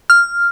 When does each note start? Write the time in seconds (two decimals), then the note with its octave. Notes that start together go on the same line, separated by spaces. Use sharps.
0.10 F6